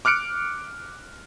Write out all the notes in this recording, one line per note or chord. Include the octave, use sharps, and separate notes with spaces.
D6 F6 F#6 C#7 D7